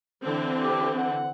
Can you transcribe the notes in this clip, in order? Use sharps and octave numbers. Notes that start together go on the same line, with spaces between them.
D3 E3 C4
G4
F#5